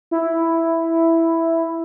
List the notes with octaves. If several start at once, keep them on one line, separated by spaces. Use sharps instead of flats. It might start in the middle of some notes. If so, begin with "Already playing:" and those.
E4